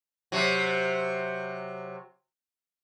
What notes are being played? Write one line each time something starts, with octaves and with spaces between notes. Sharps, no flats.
C3 F#3